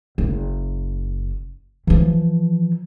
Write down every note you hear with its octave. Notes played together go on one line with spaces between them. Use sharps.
F#1
E3 F3